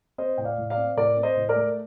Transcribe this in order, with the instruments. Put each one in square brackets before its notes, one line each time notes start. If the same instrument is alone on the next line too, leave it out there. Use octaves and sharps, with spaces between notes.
[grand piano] C4 C5 D#5
A2 G5
D5 F5
A2
D5 F5
C4
A2 A#4 D5
C4
C5 D#5
A2
A#4 D5
A3